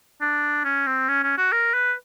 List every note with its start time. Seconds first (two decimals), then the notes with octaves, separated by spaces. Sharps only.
0.21 D4
0.64 C#4
0.87 C4
1.08 C#4
1.24 C#4
1.38 F#4
1.52 A#4
1.74 B4